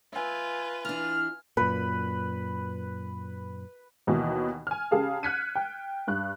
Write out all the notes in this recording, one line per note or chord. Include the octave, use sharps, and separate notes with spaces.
F4 B4 E5 G#5
E3 D4 F6
F#2 A#2 B4
D#2 B2 D#3 E3
G#5 F6
C#3 G4 G#4 F5 A5
F6 F#6 G#6 B6 C#7 D#7
G5
G2 F#6